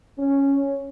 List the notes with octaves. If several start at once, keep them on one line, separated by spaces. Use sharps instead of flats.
C#4